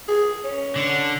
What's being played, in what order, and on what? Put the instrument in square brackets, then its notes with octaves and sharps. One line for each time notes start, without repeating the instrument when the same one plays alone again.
[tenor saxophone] G#4
C#4
[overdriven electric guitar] D3